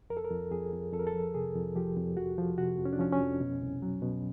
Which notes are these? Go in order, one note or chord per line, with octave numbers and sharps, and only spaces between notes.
F2 A#4
A4
A#4
F2
F2 G#4
F2
F2 A4
A#4
A4
F3
C3 G#4
F2
F3 G4
F2
F2 F#4
F3
C3 F#4
F2
C#4
D4
F3 C#4
C#4
F2
B2
C2
F#3
B2